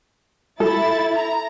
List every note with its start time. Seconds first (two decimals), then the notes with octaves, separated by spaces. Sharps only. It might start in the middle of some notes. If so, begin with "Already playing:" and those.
0.60 E4 A4 A6
1.17 A#5